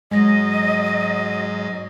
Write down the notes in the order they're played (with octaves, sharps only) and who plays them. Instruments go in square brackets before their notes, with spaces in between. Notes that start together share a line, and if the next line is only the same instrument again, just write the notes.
[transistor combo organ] G#2 [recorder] F#3 [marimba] G#3 A#6 [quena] D#5